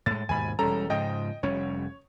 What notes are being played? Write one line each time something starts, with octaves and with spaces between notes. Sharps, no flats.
A2 G#3 A6
D#2 G#2 B2 G#5 B5
E1 G3 C#4 A4 A#5
G#2 C#3 F3 D#5 G5
F1 G3 C#4 C#5